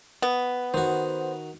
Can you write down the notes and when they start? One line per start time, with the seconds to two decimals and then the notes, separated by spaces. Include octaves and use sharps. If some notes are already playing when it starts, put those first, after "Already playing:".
0.22 B3
0.74 D#3 F#4 C5